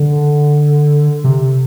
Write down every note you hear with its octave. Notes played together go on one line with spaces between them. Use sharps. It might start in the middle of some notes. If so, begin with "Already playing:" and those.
Already playing: D3
C3